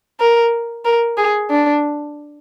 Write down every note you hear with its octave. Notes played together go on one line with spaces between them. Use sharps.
A#4
A#4
G#4
D4